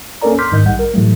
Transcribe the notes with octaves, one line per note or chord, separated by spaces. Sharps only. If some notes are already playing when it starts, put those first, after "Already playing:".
A#3 C#4 A4 A#4 D5 A#5
C6 D6 F6 G6 B6
G#2 D#3 D#5 G6
A#1 G3 F#5
A#4
A2 E3 F#3 G3 A3